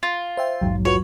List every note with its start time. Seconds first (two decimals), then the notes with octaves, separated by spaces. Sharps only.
0.03 F4
0.37 C5 E5 G5
0.61 A#1 E2 G#2 F#3
0.85 F4 F#4 B4 C#5